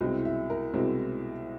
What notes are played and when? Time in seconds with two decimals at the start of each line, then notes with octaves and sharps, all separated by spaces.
0.01 C2 B2 G#3 C4 E4 D#5
0.25 E5
0.50 A#4
0.74 C2 B2 G#3 C4 E4 A#4